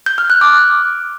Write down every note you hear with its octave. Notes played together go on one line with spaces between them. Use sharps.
G6
F6
F#6
D6